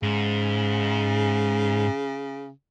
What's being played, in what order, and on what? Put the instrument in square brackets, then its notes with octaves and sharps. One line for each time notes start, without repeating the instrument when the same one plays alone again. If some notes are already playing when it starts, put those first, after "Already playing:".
[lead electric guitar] G#2 [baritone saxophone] C#3